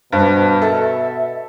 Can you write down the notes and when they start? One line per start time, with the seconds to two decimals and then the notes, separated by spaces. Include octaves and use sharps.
0.12 G2 B2 C5
0.62 A4 E5